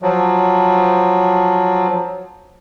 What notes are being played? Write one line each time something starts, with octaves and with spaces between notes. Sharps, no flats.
F3 F#3